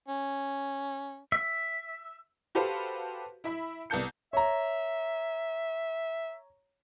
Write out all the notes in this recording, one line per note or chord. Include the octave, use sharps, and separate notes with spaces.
C#4
E5
F#4 G4 A4 B4 C5 F5
E4 E5 B5
C2 B3 A5 G6 C#7
C#5 E5 A#5